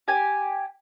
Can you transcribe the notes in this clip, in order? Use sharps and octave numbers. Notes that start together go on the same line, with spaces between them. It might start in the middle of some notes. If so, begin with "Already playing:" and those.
G4 G#5